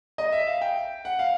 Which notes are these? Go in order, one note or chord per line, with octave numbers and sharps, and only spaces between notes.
D#5
E5
F5
G5
F#5
F5